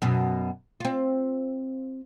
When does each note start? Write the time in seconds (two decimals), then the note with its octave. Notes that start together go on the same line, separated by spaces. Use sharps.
0.02 F#2 B2
0.80 C4 F4